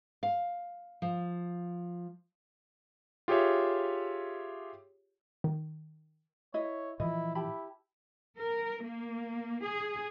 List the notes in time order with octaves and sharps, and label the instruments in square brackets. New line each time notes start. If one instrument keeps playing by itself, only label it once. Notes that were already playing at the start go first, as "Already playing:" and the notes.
[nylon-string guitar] F5
F3
[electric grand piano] F4 G4 G#4 C#5 E5
[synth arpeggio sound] D#3
[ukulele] E4 D#5 [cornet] C#5
[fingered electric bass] A#2 E3 F3 [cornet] E4 [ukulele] D#5
[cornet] E4 [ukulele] G4 A5 B5
[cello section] A#4
A#3
G#4